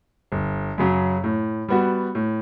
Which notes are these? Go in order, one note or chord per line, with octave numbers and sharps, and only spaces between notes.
G1
F#2 C#3 F#3
A2
G3 B3 F#4
A2